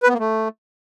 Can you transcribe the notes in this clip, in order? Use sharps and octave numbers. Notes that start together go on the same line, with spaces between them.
B4
B3
A#3
A3